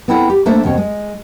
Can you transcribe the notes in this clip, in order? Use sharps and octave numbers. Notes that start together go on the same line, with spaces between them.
B3 C4 E4 A4 F#5
G4
A3 A#3 D4 A4 C5 E5
D#2 B2 C4 C#5
G#3